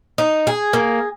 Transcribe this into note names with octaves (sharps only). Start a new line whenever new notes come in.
D#4
G#4
A#3